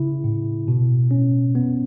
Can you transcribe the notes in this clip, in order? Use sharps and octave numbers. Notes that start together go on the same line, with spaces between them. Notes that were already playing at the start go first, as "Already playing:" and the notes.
Already playing: C#3 E4
A2
B2
C#4
B3